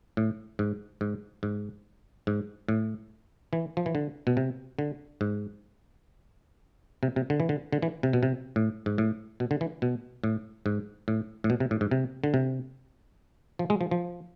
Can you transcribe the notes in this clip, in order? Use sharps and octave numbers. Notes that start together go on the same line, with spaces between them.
A2
G#2
G#2
G#2
G#2
A2
E3
F3
E3
D3
B2
C3
D3
G#2
C3
C3
D3
E3
D3
D3
E3
C3
B2
C3
A2
G#2
A2
B2
D3
E3
B2
A2
G#2
A2
A2
B2
C3
A2
G#2
C3
D3
C3
F3
G#3
F3
F3